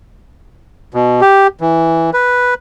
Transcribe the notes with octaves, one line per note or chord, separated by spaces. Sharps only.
B2
G4
E3
B4